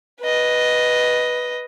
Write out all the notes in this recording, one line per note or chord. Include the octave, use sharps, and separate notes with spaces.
B4 D#5